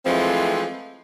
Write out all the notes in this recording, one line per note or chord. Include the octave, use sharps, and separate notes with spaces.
E3 F3 G#3 A3 C4